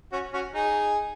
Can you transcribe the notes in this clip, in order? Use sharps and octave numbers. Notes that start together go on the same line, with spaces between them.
C#4 F#4
C#4 F#4
D#4 G#4